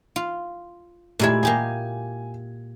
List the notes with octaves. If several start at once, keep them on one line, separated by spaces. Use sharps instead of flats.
F4
A#2 G#3 A3 E4 G4 G#6
A#3 G4 G#4 G#5